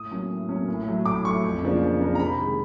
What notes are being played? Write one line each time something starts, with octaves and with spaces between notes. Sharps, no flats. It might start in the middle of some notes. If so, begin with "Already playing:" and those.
Already playing: A2 D#6
F#3 A#3 C#4
A2
F#3 A#3 C#4
A2
F#3 A3
A2 D6
F#3 A3 C#6
F2
C#3 F3 A#3 D4
F2
C#3 F3 A#3 D4
A#5
C3 B5
D#3 G#3